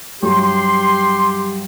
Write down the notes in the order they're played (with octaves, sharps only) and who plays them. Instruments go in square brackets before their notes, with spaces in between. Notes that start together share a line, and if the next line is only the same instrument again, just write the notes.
[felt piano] G2 F#3 [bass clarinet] G4 [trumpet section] C6